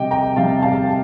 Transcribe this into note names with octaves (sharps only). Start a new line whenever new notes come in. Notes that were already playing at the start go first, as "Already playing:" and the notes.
Already playing: C3 G3 G4 D#5 G5
G5 A#5
C3 G3 F5 A5
F5 A5